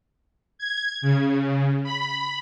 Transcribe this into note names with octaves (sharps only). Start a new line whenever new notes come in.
G#6
C#3
B5